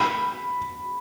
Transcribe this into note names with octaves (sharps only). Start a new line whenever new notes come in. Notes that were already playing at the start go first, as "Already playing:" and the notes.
Already playing: B5